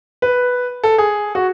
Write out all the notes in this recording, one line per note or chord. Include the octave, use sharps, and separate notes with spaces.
B4
A4
G#4
F#4